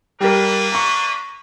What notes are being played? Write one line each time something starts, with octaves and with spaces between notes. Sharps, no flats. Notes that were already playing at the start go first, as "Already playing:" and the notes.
G3 A#3 D4 G4 A#4 B4
A#5 C#6